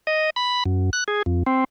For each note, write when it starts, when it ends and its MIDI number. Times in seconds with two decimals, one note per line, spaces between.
0.07 0.30 75
0.36 0.63 83
0.66 0.90 42
0.93 1.04 90
1.08 1.22 68
1.26 1.43 41
1.46 1.64 60